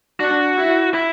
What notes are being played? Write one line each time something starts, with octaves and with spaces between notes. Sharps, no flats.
D4 F#4
E4
E4